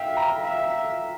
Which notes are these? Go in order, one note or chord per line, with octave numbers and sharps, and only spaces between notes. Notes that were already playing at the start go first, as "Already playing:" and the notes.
Already playing: E5 F5 G5
A#5
E5